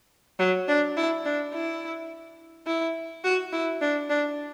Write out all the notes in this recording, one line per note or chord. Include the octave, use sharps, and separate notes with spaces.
F#3
D4
E4
D4
E4
E4
F#4
E4
D4
D4